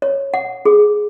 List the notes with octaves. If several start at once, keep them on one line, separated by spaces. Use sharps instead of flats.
C#5
F#5
G#4